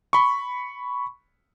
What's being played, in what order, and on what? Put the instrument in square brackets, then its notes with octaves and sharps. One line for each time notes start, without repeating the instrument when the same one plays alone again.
[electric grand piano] B5 C#6